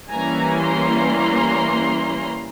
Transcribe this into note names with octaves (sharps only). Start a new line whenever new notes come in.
E3 G3 A#3 C#4 E4 G#5 A#5
A#5 C6